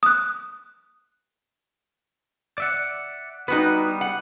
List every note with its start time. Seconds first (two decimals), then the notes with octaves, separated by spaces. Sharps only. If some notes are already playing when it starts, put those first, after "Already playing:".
0.03 D#6 F#6
2.58 D5 E5 F#5
3.48 G3 B3 D#4 F#4 B4
4.01 F#5